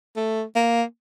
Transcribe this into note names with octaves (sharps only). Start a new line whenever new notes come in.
A3
A#3